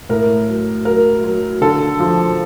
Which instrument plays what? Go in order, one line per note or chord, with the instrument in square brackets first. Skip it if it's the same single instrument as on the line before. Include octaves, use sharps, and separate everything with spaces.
[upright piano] A2 A#4
F#3
F#3 A#4
F#3
D3 A4
F3